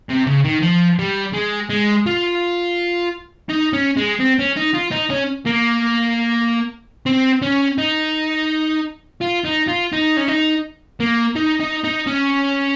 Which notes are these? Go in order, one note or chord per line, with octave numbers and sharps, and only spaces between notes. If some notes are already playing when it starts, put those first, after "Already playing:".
C3
C#3
D#3
F3
G3
G#3
G#3
F4
D#4
C#4
G#3
C4
C#4
D#4
F4
D#4
C#4
A#3
C4
C#4
D#4
F4
D#4
F4
D#4
C#4
D#4
A#3
D#4
D#4
D#4
C#4